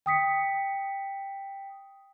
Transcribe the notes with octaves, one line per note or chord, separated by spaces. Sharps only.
G5 D#6 B6 C#7